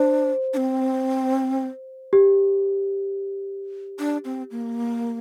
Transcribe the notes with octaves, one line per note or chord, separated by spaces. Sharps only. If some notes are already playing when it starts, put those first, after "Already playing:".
Already playing: D4 C5
D4
C4
G4
D4
C4
A#3